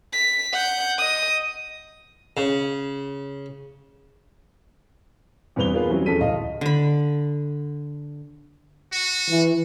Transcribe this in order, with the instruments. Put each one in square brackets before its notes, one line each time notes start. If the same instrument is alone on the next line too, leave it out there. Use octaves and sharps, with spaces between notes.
[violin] B6
F#5 G6
D#5 D#6
[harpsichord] C#3
[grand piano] E2 G2 C4 B4 F7 G7
A#3 B3 F4 G#4 B4
E3 F#3 G3 C4 C#4
F2 C#4 G#4 A4 B6 D#7
D1 D#5 F5
[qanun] D3 B5
[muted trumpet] F#4
[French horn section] E3